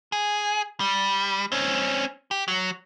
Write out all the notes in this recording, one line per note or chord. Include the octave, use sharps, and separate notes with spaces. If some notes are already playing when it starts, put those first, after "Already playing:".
G#4
G3
C4 C#4
G4
F#3